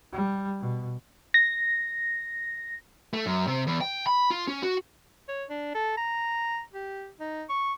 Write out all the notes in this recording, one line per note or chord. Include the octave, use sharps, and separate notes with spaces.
G3
B2
A#6
A3
F#2
C3
E2
G5
B5
F4
C#4
F#4
C#5
D4
A4
A#5
G4
D#4
C#6